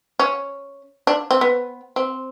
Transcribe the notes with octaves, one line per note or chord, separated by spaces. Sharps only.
C#4
D4
C4
B3
C4